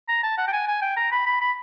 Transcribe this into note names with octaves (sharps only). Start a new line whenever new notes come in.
A#5
A5
F#5
G5
G#5
G#5
G5
A#5
B5
B5
B5